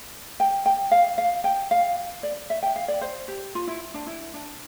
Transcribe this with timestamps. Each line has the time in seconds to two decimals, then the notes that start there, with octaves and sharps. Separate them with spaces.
0.40 G5
0.66 G5
0.91 F5
1.18 F5
1.44 G5
1.71 F5
2.23 D5
2.50 E5
2.63 G5
2.76 F5
2.88 D5
3.01 C5
3.28 G4
3.55 F4
3.67 E4
3.94 D4
4.07 E4
4.34 D4